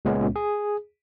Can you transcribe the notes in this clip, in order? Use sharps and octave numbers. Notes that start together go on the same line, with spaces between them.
C#2 A#2 G#3 B3 C#4
G#4